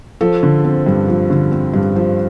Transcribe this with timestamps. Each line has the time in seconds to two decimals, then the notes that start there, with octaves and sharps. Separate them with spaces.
0.21 F3 A4
0.43 D3
0.65 C4
0.86 G2
1.08 F3
1.30 D3
1.52 C4
1.74 G2
1.96 F3 C5